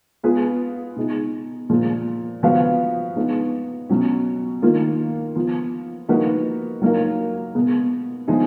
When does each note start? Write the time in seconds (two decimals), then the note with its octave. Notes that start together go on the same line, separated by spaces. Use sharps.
0.23 G#3 B3 F4 G#4 B4
0.96 B2 G#3 D#4 G#4
1.70 A#2 F3 G#3
2.43 F3 B3 F#4 B4 F5
3.16 G#3 B3 D#4 G#4 B4
3.89 B2 F#3 C#4
4.62 D#3 A#3 F4 A#4
5.35 F3 B3 F4
6.09 F3 A#3 D#4 F#4 B4
6.82 F#3 A#3 D#4 A#4 F5
7.55 B2 G#3 B3
8.28 F3 G#3 B3 D#4 G#4